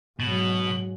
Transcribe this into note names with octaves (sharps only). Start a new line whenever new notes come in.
G#2 B2 F#3 F#7